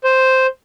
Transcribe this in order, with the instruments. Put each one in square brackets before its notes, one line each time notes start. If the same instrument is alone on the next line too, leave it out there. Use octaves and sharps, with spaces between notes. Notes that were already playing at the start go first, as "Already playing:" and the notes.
[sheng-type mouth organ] C5